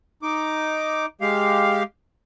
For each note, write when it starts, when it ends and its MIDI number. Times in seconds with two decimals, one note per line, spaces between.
0.22 1.06 63
0.22 1.06 86
1.21 1.83 56
1.21 1.83 67
1.21 1.83 77